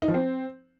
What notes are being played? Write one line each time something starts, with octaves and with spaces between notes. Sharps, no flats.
D#4
F3
C4